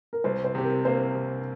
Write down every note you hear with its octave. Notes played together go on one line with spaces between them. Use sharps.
A#4
C2 C5
C5
C3 G4
A#4
A#3 C5
C3